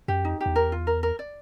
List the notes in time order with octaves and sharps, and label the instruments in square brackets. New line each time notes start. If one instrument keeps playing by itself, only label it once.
[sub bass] F#2 [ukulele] G4
[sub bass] F2 [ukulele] D#4
[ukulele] G4
[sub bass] E2
[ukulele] A#4
F4
A#4
A#4
D5